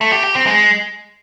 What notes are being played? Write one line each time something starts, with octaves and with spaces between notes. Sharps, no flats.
A3
G4
G4
C4
G#3